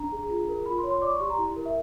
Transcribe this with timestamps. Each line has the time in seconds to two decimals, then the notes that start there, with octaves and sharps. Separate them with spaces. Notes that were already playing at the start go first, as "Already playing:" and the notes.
Already playing: D4 A#5
0.12 G#4
0.30 F4
0.49 A#4
0.66 F4 B5
0.78 C6
0.83 C#5
0.90 C6
1.02 D5 D6
1.11 C#6
1.20 G4 C6
1.30 A#5
1.38 E4
1.56 A#4
1.66 E5